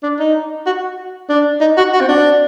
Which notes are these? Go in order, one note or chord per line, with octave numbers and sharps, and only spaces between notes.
D4
D#4
F#4
D4
D#4
F#4
F#4
C4
D4